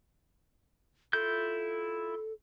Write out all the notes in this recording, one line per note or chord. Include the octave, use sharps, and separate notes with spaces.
E4 F4 A4 G6